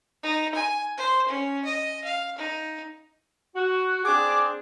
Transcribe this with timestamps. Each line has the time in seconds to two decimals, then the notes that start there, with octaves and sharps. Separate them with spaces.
0.23 D#4
0.55 G#5
0.97 C5
1.28 C#4
1.65 D#5
2.04 F5
2.38 D#4
3.56 F#4
4.05 C4 D4 G#4 D6